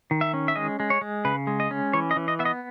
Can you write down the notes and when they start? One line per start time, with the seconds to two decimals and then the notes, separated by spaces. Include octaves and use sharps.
0.11 D#3
0.21 E5
0.34 C#4
0.48 E5
0.56 G#3 D#5
0.80 G#3
0.90 C#5
1.01 G#3
1.25 C#3 B4
1.47 G#3
1.60 D#5
1.71 C#4
1.93 E3 C#5
2.11 D#5
2.16 E3
2.28 D#5
2.39 B3 E5
2.45 D#5